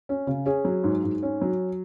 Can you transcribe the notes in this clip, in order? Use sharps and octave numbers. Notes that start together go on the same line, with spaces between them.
C#4
C#3
C#4 G#4
F#3
G#2
G#2
C#4
F#3